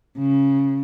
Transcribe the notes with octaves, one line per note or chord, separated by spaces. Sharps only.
C#3